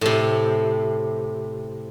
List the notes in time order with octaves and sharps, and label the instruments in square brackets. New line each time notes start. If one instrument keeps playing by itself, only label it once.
[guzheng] A2 C3